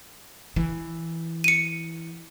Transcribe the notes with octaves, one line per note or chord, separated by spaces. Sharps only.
E3
C#7 D#7